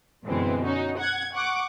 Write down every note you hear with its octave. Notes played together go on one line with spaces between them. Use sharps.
F#2 B2 D3 E3 G#3 C4
C#4 D#4 F#4
F#5 F#6 G#6
F#5 C#6 D6